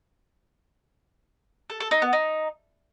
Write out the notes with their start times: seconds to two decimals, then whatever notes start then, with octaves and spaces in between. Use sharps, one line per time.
1.70 A4
1.80 A4
1.91 D#4
2.02 B3
2.13 D#4